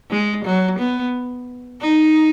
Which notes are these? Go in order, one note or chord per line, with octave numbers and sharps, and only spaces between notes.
G#3
F#3
B3
D#4